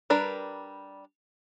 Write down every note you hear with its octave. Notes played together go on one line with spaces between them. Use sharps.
G3 D4 A#4 B4